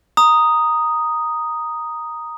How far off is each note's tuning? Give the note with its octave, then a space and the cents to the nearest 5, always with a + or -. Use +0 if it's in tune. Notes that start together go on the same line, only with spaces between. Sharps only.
A#5 +0 D#6 +0